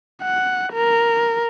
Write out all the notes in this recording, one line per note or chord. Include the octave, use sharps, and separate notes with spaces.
F#5
A#4